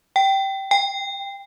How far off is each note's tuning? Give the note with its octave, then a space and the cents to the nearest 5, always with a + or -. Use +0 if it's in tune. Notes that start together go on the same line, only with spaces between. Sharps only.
G5 -15
G5 +25